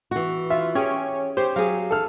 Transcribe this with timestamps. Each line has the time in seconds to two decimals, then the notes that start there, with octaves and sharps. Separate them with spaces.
0.11 E3 F#4
0.50 F4 E5
0.75 C#4 G4 G#4 C#5
1.37 G4 C5 C#5
1.56 F#3 G#4 F5
1.90 A4 F6